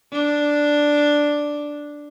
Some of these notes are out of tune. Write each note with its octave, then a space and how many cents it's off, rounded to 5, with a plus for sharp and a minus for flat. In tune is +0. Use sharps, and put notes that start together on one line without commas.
D4 +0